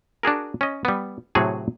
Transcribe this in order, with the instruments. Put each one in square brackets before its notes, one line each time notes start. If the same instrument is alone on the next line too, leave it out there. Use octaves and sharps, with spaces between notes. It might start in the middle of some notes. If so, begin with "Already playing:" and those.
[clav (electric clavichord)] D4 F#4 G#4 A#4
C#4 D#5
G3 B3
A2 C3 F#3 A3 F#4 G#4